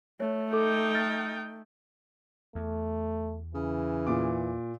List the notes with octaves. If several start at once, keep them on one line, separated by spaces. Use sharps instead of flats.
A3 C#5
D#4 A4 G5 D6
F6 A6
E2 A3
C#3 E3
A#2 D6